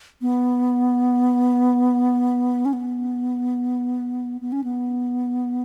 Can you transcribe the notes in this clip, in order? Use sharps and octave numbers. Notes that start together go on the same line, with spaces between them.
B3
C#4
B3
B3
C#4
B3